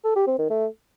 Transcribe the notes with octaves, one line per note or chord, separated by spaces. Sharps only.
A4
G4
C4
D#3
A3